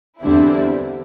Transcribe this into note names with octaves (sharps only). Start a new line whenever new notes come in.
E2 D3 G3 C4 E4